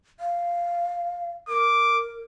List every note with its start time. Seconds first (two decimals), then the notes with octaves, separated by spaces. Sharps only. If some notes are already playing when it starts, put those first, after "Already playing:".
0.20 F5
1.48 A#4 D6